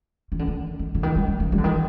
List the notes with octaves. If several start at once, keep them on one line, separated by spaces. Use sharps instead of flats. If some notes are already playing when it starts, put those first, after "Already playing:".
D#3
D3
D#3
D#3
D3
D#3
G3
A3
A#3
G3
D3
D#3